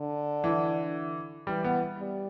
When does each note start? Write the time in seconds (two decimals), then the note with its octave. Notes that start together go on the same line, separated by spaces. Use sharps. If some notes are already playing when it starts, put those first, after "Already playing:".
Already playing: D3
0.44 E3
1.47 E3 G3
1.64 B3
1.99 G3